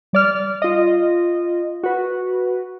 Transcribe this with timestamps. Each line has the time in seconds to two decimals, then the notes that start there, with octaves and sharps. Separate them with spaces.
0.13 G3 D5 F6
0.62 F4 D#5
1.83 F#4 B4